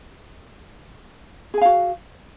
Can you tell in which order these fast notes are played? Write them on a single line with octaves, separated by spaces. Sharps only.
G#4 G#5 F5 F#4